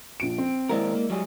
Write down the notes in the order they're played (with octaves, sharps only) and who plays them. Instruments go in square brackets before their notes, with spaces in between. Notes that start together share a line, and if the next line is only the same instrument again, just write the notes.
[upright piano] A#1 F3 D7
C4
[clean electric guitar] D#2 C4 A#4 [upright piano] G#3 E4 D5
[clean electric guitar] A#3
F#3 G3 G#4